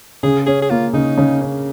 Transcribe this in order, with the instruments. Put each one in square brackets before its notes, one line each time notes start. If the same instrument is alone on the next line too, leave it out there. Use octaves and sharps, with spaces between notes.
[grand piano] C#3 [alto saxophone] G#4
[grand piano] C#4 [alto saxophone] G#4
[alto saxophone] G#4
[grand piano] A#3 [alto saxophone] F4
[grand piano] C#3 [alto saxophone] D#4
[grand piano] C#3
C#4